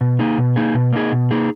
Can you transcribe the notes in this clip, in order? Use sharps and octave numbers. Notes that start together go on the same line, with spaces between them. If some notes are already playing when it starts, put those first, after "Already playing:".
B2
A#3 D#4 G#4
B2
A#3 D#4 G#4
B2
A#3 D#4 G#4
B2
A#3 D#4 G#4